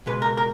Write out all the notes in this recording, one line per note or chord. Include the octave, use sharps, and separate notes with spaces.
C#2 B2 G#3 B4
A#4
A#4